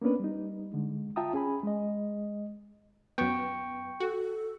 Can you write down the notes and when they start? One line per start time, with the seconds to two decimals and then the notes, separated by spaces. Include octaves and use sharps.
0.02 A#3 B3 C#4 D4 B4
0.20 G3 D#4
0.73 D3 G#3
1.16 F4 E5 G5 A5 A#5 D#6
1.33 C#4 G#4 G#5 B5
1.63 G#3 D#5
3.18 F#2 B3 G5 C#6
4.00 F#4 A4